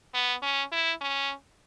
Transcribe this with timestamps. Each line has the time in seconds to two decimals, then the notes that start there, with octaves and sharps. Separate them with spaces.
0.14 B3
0.42 C#4
0.72 E4
1.01 C#4